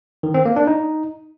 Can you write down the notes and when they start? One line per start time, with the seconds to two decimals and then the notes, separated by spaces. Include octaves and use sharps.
0.23 D#3
0.34 C4
0.45 A#3
0.56 D4
0.67 D#4